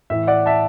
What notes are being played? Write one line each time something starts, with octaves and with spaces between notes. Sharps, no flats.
A2 E3 E5
D5 F#5
E5 A5